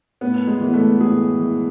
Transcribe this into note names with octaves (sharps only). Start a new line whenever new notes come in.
A2 B3
G#3
E3
B3
A3
A2 G#4
E3